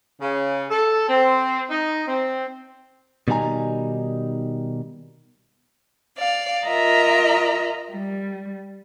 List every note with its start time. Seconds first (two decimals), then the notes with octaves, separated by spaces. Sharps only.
0.21 C#3
0.71 A4
1.09 C4
1.70 D#4
2.08 C4
3.28 B2 D#3 G3 D#4 G#5 A#5
6.17 D5 F5
6.66 F4 A#4 D#5 E5 A#5
7.91 G3